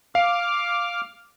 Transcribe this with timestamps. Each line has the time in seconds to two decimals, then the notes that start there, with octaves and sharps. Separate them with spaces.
0.15 F5 D6 F6